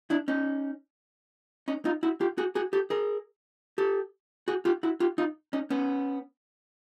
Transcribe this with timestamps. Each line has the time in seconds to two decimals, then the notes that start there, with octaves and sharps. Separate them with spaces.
0.10 D4 E4
0.28 C#4 D#4
1.68 C#4 D#4
1.85 D#4 F4
2.03 E4 F#4
2.21 F4 G4
2.38 F#4 G#4
2.55 F#4 G#4
2.73 G4 A4
2.90 G#4 A#4
3.78 G4 A4
4.48 F#4 G#4
4.65 F4 G4
4.83 E4 F#4
5.00 F4 G4
5.18 D#4 F4
5.53 C#4 D#4
5.70 B3 C#4